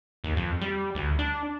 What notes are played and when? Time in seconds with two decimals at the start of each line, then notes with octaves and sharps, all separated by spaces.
0.24 D#2
0.36 F2
0.61 G3
0.95 D2
1.19 D4